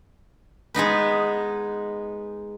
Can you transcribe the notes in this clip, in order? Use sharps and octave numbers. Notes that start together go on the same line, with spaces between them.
G#3 B3 D#4 B4